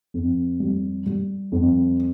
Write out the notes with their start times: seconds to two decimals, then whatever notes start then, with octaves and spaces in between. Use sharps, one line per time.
0.14 F2
0.60 G3
1.06 G3
1.52 F2